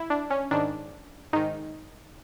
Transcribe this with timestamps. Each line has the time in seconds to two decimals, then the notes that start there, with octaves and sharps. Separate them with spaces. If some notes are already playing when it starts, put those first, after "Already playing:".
Already playing: E4
0.10 D4
0.30 C#4
0.51 G#2 D#3 D4
1.33 G#2 D#3 D#4